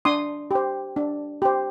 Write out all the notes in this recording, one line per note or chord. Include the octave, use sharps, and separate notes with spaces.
D4 C6 D#6
G4 C5
D4
G4 C5